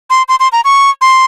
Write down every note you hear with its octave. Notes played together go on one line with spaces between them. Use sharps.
C6
C6
C6
A#5
C#6
C6